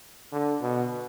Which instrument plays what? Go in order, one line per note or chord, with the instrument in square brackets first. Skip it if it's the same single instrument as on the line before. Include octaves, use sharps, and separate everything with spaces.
[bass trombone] D3
B2